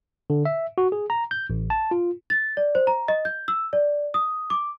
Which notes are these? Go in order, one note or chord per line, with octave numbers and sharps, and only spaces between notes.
D3
E5
F#4
G#4
A#5
G6
A1
A5
F4
A6
D5
C5
A#5
D#5
G6
E6
D5
D#6
D6